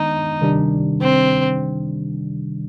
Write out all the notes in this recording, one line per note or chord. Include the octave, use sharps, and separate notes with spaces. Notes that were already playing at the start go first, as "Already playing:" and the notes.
Already playing: D#3 G#3 B3 D4 D#4
C3 D#3 G3 D4
C4